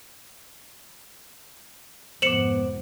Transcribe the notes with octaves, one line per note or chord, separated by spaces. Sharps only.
F1 G#2 B3 C5 D6 C#7 E7 F#7